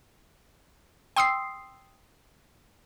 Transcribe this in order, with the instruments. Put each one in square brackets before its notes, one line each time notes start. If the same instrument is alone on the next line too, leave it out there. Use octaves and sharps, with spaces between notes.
[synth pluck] G5 C6 D#6 E6 C7